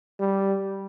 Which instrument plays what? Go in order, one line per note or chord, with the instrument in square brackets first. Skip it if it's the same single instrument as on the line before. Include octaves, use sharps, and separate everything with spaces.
[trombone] G3